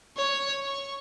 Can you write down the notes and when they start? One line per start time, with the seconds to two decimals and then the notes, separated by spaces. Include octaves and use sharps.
0.17 C#5
0.66 C#6